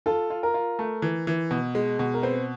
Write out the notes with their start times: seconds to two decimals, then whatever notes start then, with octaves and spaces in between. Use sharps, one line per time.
0.06 F4 A4
0.30 F4
0.43 A#4
0.54 F4
0.79 A3
1.02 E3
1.27 E3
1.51 B2
1.75 G#3
1.99 B2
2.14 A#4
2.23 C4 B4